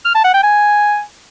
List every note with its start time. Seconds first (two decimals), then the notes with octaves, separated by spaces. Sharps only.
0.05 F6
0.15 A5
0.24 F#5
0.34 G5
0.43 G#5